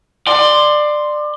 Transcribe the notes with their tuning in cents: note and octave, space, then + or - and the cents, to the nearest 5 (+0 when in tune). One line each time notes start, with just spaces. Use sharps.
D5 +25 C6 +0